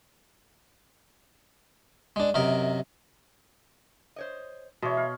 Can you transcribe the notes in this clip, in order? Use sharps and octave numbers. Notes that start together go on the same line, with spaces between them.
G#3 D4
F#2 C3 A#4 D#5
C5 C#5 D#5
B2 E3 G#3 C#5 E5 C6
F5 B5